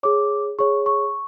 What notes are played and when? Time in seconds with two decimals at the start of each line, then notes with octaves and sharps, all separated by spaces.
0.03 G#4 C#5 D6
0.59 G#4 C#5 C#6
0.86 C#6